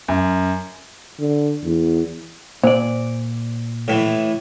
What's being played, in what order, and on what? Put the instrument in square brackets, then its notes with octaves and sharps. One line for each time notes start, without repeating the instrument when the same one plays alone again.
[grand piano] F#2
[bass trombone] D3
E2
[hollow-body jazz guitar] A#2 D5 [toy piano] C5
[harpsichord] A2 E3